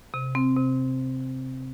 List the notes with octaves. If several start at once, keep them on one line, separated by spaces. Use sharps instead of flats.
C3
C4
C3